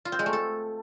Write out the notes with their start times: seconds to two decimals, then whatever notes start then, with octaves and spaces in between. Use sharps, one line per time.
0.05 F4
0.12 C4
0.19 G#3
0.26 A3
0.33 A4